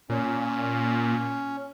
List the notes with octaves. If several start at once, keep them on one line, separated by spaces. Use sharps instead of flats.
A#2 C#4